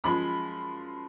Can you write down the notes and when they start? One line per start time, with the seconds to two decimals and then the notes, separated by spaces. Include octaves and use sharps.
0.04 F#2 F3 G#3 B5